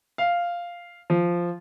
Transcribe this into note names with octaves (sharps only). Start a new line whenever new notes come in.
F5
F3